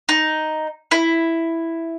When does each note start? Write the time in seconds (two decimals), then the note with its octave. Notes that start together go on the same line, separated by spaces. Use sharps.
0.09 D#4
0.91 E4